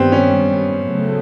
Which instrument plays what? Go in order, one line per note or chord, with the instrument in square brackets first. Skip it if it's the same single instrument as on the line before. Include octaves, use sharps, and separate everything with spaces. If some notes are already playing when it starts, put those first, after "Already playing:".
Already playing: [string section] G2 D#3 G3 [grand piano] B3 C4
[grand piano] C#4
[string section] C#3 F#3 A3